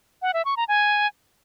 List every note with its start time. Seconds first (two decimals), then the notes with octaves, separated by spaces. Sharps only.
0.22 F#5
0.34 E5
0.45 C#6
0.57 A#5
0.68 G#5